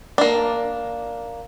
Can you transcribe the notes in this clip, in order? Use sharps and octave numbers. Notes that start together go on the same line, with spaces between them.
A#3 D4